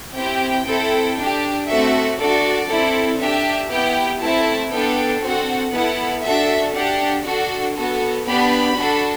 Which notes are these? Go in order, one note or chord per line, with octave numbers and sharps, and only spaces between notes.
C4 E4 G4 G5
C4 E4 A4
D4 G4
A3 C4 F#4 A4 E5
D4 F#4 A4 D5
C4 E4 A4
D4 G4 E5
B3 E4 G4 G5
A3 C4 E4 A5
B3 D4 A4 G5
C4 F#4 A4 F#5
B3 E4 A4 F#5
D4 F#4 A4 E5
D4 G4 F#5
D4 F#4 A4
B3 F#4 A4
B3 D4 G4 B5
D4 F#4 A4